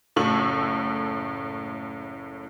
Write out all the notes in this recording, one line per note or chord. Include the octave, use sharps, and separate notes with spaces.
F#1 A2 A4 C#6 E6 F#7